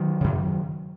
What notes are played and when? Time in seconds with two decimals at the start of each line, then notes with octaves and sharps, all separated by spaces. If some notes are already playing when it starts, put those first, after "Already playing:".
Already playing: D#3 F#3
0.21 F#2 C#3